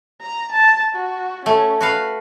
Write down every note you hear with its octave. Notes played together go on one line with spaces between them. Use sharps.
A#5
A5
F#4
A3 C#4
F#4 B4 F5